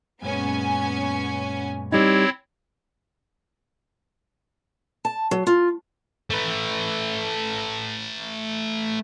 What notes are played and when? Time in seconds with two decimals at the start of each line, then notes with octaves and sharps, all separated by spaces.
0.22 F#2 A#2 G#3 B3 C#4 G#5
1.92 G3 C4 D#4 E4 C#5
5.05 A5
5.31 F#3
5.47 F4
6.30 A3 B4